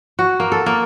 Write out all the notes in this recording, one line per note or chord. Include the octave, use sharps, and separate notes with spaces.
F#4
A#3
A4
A#3